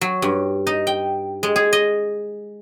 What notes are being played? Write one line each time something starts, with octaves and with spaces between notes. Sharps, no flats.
F#3
G2
D#4
G5
G#3
G#4
D#5